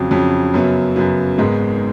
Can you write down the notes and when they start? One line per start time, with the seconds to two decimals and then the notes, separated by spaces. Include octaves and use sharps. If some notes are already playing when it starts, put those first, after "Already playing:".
Already playing: F2 C#3 F#3
0.11 F2 C#3 F#3
0.54 F#2 C#3 F#3 B3
0.96 F#2 C#3 F#3 B3
1.38 G#1 G#2 D#3 G#3 B3